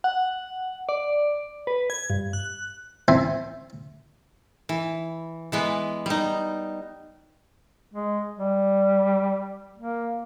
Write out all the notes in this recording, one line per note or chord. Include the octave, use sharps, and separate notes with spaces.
F#5
D5
B4
G#6
G2
F#6
C4 E4 C5 G#5 A5 B5
E3
E3 G#3 B3
G3 D#4
G#3
G3
A#3